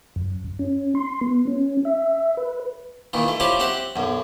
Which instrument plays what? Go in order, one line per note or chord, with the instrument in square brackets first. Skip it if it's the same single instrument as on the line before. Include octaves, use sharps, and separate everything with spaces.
[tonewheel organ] F#2
C#4
C6
B3
C#4
E5
B4
[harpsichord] A#2 D#3 E3
A3
C#4 E4 F4 G4 C5 D5
C4 G4 E5 F#5
B1 F#2